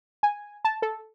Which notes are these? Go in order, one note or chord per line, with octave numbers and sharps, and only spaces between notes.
G#5
A5
A4